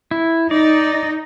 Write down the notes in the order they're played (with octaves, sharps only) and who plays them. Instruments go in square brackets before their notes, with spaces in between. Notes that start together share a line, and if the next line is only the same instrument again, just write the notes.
[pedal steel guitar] E4
[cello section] D#4 [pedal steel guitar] D5